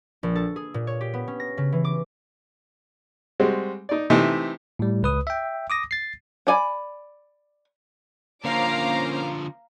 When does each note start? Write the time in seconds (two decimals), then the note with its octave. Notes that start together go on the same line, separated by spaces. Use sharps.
0.23 A#1
0.35 A4
0.56 G#4
0.74 A#2
0.87 C#5
1.01 G4
1.14 B3
1.28 C#4
1.40 A#6
1.57 C#3
1.72 E3
1.85 D6
3.40 G3 G#3 C4 F#4
3.89 D#4 D5
4.10 C3 E3 A3 D#4
4.79 A2 G3
5.03 C#2 B4 D#6
5.27 E5 G5
5.70 D6 D#6 A#6
5.91 A6 C7
6.47 D4 D5 G#5 B5
8.44 D3 F3 A#3 C#4 C5 F5 A#5 D6